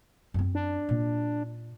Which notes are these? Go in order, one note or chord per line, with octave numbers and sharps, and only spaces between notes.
F#2 C4
D4
A#2